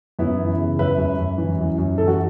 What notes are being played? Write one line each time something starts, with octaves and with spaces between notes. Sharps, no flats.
F#2 B3 E4
E3
C#3
F#2 B4 E5
F#2
F#2
E3
F#2
F#2
E3 A4
F#4